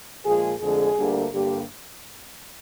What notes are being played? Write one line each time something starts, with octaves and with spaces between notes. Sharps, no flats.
A#2 F3 G#3 G#4
F2 D3 G#3 G#4
D2 D3 G3 A#3
G2 D3 G3 A#3 G4